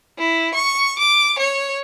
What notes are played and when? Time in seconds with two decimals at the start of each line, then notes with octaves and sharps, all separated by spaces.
0.18 E4
0.54 C#6
0.99 D6
1.39 C#5